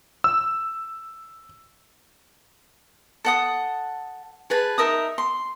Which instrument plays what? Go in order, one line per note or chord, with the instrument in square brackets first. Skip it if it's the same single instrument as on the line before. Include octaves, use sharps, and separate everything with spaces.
[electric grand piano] E6
[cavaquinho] A4 F#5 D#6
G#4 B4 A5
D#4 A#4 E5 D#6
C6